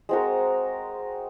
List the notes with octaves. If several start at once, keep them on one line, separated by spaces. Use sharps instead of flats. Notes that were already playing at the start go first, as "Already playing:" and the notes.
G#3 C4 F#4 A#4